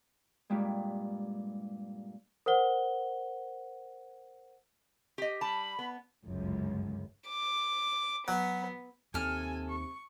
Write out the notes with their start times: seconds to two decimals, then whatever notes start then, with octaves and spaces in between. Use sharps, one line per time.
0.50 G2 A#2 G3 G#3
2.46 A#4 C5 F#5 G7
5.18 G4 D#5
5.41 G3 A5 B5
5.79 B3
6.24 G1 C#2 F#2
7.29 D6
8.28 F#3 B3
9.14 D#2 C3 A4 G#5 F6
9.69 C#6